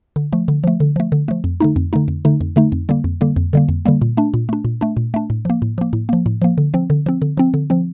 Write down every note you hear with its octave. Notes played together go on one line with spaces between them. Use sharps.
D3
F3 A3
D3
F3 A3
D3
F3 A3
D3
F3 A3
F2
D3 A3 D#4
F2
D3 A3 D#4
F2
D3 A3 D#4
F2
D3 A3 D#4
F2
D3 G3 A#3
F2
D3 G3 A#3
F2
D3 G3 A#3
F2
D3 G3 A#3
A#2
A3 D4
A#2
A3 D4
A#2
A3 D4
A#2
A3 D4
A2
F3 A#3
A2
F3 A#3
A2
F3 A#3
A2
F3 A#3
D3
F3 C4
D3
F3 C4
D3
F3 C4
D3
F3 C4